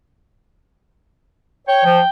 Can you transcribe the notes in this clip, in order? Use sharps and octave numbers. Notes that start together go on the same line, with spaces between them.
C#5 G5
F3